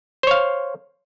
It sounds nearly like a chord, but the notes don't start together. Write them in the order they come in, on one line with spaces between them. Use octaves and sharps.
C5 C#5 F5